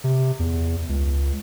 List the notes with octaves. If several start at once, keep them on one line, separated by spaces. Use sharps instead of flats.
C3
E2
C#2